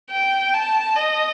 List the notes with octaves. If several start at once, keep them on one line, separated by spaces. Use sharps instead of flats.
G5
A5
D#5